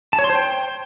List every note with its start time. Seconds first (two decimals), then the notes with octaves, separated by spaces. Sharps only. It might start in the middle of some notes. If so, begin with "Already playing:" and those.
0.13 A5
0.19 C#5
0.24 C6
0.30 C5
0.35 G5